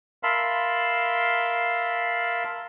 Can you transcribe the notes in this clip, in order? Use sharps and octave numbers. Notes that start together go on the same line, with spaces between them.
A#4 E5 F5 A5 B5 C6